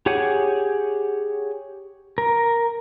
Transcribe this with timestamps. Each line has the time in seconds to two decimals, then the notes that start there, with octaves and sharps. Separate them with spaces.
0.06 G4 G#4 C#5 F#5 G#5
2.18 A#4